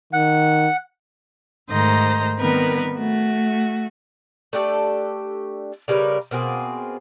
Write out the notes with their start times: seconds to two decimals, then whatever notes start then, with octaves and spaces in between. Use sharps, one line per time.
0.13 D#3 F#5
1.70 G#2 D#3 A3 C5 D#5 A#5
2.39 D#3 G3 B3 C4 A#4 B4
2.96 A3 F#4
4.53 A3 D4 G4 A4
5.88 C#3 G3 A#4 B4
6.31 B2 A#3 C4 G#4